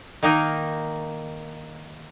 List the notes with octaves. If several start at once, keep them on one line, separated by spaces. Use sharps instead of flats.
D#3 A#3 D#4